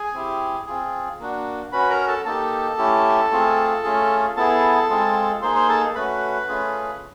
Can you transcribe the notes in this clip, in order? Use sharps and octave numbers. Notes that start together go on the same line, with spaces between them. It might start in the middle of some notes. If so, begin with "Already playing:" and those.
Already playing: G#4 G#5
C4 E4 G4
C4 F4 G#4
A#3 D4 F#4
C#4 F#4 B4 B5
A#4 A#5
A4 A5
A#3 D#4 G4 A4 A5
A3 C#4 E4 G4
A3 C4 F4 G#4
A3 C#4 F4 G#4
B3 E4 G#4 A4 A5
G#3 C4 F4 G#4
A#3 D#4 G#4 C5 C6
C5 C6
A4 A5
A3 C#4 F#4 B4 B5
A3 C#4 F4 G#4